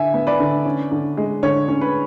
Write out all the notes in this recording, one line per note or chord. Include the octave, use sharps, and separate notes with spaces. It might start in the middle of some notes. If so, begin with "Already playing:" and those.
Already playing: D3 E5 G#5
B3
B4 D5
D3
C#4
D3
G#3
D3 C#5
C#4
B4